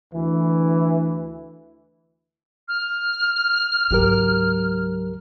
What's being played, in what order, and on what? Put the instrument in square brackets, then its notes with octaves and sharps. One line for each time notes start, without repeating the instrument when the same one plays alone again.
[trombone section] D2 E3
[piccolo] F6
[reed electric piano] C#2 G4 A#4 [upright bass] G#2 F#3